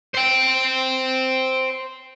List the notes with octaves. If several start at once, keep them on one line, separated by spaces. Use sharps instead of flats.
C5 G5